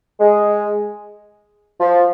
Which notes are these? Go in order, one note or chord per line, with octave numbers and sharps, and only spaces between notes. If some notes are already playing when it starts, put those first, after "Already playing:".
G#3
F3